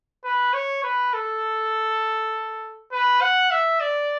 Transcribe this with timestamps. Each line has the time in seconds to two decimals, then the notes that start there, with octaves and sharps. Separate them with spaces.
0.25 B4
0.54 C#5
0.84 B4
1.14 A4
2.92 B4
3.22 F#5
3.51 E5
3.81 D5